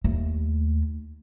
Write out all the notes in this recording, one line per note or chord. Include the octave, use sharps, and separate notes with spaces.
D#2 A3